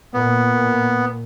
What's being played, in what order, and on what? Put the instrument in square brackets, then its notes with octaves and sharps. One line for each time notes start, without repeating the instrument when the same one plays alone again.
[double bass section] A#2 [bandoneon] B3